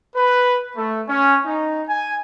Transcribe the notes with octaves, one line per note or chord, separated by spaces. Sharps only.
B4
A3
C#4
D#4
G#5